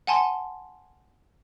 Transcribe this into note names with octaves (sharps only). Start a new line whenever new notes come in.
F#5 G#5 A5 C6